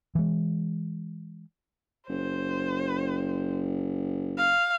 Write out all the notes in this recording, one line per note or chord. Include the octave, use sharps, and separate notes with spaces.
E3 G#3
F#1 C5
F5